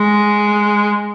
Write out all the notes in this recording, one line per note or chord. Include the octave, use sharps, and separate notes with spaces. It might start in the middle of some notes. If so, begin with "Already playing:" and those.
Already playing: G#3